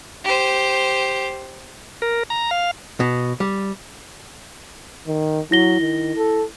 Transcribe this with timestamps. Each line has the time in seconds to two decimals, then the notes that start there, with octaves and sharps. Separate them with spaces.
0.24 G4 C5
2.02 A#4
2.30 A#5
2.51 F5
3.00 B2
3.40 G3
5.07 D#3
5.51 F#3 E4 A#6 G7
5.81 D#3
6.16 A4